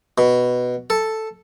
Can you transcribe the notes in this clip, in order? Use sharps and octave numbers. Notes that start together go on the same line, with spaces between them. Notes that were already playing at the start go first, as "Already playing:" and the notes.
B2
A4